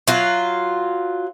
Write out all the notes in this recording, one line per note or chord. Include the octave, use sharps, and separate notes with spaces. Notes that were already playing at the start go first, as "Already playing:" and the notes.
F#3 F4